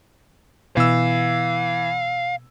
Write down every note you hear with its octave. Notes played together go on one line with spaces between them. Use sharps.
B2 E3 F5 E6